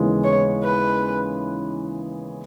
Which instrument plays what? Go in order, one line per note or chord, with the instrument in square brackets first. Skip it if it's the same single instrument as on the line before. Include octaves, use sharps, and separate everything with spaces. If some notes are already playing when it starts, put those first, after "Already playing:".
Already playing: [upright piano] D#2 C#3 E3 G#3 B3
[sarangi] C#5
B4